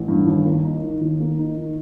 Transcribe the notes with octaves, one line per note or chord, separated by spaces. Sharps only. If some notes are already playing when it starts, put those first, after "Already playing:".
Already playing: A1
G2
D#2
A#3
D#4
D#3
D#2
A#3
D#4
D#3